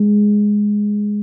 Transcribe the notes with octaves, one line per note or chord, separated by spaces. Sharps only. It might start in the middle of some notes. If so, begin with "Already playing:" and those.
Already playing: G#3